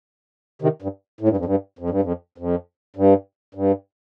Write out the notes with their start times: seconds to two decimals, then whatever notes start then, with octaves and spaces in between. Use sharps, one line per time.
0.62 C3 D#3
0.82 G2
1.21 A2
1.28 G2
1.37 F2
1.45 G2
1.79 F2
1.90 G2
2.02 F2
2.38 F2
2.96 G2
3.54 G2